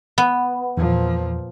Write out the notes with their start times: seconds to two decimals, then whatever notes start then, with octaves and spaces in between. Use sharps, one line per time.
0.18 B3
0.77 E2 A#2 F3